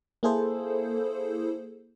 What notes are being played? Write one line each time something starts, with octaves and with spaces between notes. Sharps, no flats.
A#3 E4 G#4 A4 C5